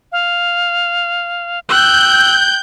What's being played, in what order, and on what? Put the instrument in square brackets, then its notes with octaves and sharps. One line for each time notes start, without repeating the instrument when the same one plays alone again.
[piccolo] F5
[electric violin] G5 F#6 [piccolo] E6 [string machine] G6